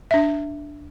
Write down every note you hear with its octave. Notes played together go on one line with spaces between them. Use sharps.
D4 E5